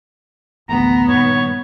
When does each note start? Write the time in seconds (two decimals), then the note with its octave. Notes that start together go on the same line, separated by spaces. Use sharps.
0.69 A1 D2 B3 A#5
1.09 G2 A#2 D#3 C#5